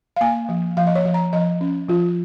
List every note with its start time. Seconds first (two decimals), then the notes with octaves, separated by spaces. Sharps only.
0.16 F5
0.21 A#3 G#5
0.49 F3
0.77 F3 F5
0.87 D#5
0.95 C#5
1.05 F3
1.14 A#5
1.33 F3 D#5
1.61 C#4
1.89 F3 F4